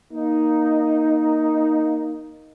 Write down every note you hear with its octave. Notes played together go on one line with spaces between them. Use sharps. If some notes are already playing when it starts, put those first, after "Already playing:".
A#3 D#4